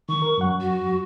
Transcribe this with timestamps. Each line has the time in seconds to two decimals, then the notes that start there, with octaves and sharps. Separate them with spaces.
0.09 D#3 C#6
0.22 A#4
0.38 F#2 F#3 F#5
0.61 F#4